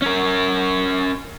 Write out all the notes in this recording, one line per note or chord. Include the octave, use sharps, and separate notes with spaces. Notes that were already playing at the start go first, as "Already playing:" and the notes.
C#4 A#4